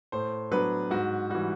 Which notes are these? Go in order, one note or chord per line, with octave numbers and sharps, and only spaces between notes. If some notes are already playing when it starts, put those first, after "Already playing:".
A2 C5
F#3 B3 D4 B4
G#2 F#4
E3 G3 F#4